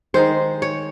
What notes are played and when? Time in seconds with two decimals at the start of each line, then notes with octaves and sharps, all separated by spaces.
0.14 D#3 G#3 D#4 C5
0.62 C#5